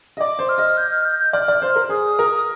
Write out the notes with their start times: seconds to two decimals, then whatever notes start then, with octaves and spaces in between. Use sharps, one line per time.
0.17 D#5
0.20 D5 D6
0.39 C5
0.49 F6
0.58 D#5
0.78 G6
0.92 F6
1.05 G6
1.19 G6
1.33 D5 F6
1.48 D5
1.62 C5
1.76 A#4
1.89 G#4 D#6
2.19 A#4